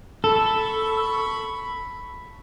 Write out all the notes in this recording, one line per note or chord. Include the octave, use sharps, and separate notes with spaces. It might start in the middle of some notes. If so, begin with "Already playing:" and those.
A4 B5 C#6